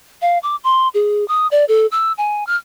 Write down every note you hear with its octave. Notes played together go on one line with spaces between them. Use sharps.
F5
D6
C6
G#4
D#6
D5
A4
E6
G#5
F6